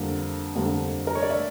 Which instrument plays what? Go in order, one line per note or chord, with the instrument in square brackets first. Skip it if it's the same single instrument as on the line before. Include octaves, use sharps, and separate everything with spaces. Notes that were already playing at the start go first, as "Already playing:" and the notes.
Already playing: [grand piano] F2 D3 G3 A#3
F2 D3 G3 A#3
A#4
C#5
D5
E5